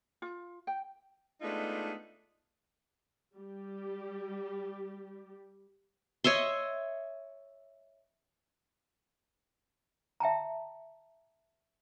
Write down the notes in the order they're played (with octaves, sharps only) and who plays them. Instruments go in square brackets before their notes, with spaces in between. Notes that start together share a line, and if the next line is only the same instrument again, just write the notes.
[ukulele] F4
G5
[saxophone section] G#3 A3 B3 D4 D#4 F4
[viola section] G3 G4
[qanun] C#5 D#5 E5 C6
[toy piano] E5 G5 A5 A#5